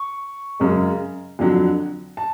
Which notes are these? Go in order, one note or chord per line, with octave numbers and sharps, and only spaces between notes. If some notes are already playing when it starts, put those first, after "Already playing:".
Already playing: C#6
F#2 C#3 G#3
F2 D3 F#3
A5